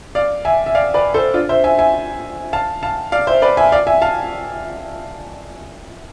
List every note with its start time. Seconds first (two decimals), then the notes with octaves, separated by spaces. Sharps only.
0.15 D5 F5
0.45 E5 G#5
0.66 E5
0.75 D5 F5
0.94 B4 D5
1.14 A4 C5
1.34 D4 F4
1.49 C5 E5
1.64 E5 G#5
1.78 E5 G#5
2.53 F5 A5
2.83 F5 A5
3.12 D5 F5
3.27 C5 E5
3.42 B4 D5
3.57 E5 G#5
3.72 D5 F5
3.87 E5 G#5
4.02 F5 A5